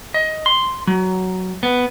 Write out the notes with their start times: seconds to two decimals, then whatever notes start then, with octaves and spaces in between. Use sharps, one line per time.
0.14 D#5
0.46 C6
0.87 F#3
1.63 B3